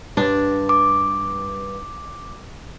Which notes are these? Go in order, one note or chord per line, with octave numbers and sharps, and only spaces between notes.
G2 D4
D6